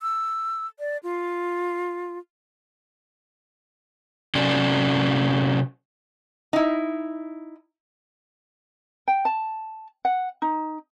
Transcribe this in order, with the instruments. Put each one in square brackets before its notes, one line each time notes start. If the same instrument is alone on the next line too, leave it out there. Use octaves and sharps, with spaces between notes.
[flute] E6
D5
F4
[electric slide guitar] C3 F#3 C#4 D5
[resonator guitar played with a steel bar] D#4 E4
[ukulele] G5
A5
F#5
D#4